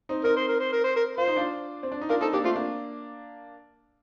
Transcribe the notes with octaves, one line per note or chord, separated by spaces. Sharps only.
C4 D#4
C4 D#4 A#4
C5
A#4
C5
A#4
C5
A#4
F4 C5
D#4
D4 F4
C4
D4
D#4
D4 F4 A#4
C4 D#4 A4
A#3 D4 G4
A3 C4 F4
A#3 D4